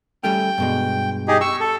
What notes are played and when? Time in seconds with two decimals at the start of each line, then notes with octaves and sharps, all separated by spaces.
0.24 G3 A3 C#4 G5
0.58 G2 B2 G#3
1.28 D#4 G4 G#4
1.41 G4 C#6 E6
1.60 A4